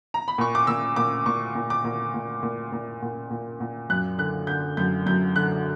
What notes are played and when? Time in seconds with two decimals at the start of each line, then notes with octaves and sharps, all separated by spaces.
0.14 A#5
0.28 B5
0.38 A#2 C#6
0.55 D6
0.67 A#2 E6
0.96 A#2 D6
1.26 A#2 C#6
1.55 A#2
1.70 D6
1.84 A#2
2.14 A#2
2.43 A#2
2.72 A#2
3.02 A#2
3.30 A#2
3.60 A#2
3.90 F#2 F#6
4.18 D3 F#6
4.47 D3 G6
4.77 F#2 G6
5.06 F#2 G6
5.35 D3 F#6